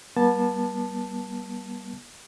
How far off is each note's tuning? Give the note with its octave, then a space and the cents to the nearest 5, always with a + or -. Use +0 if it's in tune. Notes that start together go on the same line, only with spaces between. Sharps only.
G3 -20 B3 -45 A5 +0